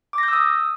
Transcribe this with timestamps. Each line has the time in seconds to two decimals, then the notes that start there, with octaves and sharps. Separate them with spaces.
0.13 D6
0.18 A#6
0.23 G6
0.28 E6
0.33 D#6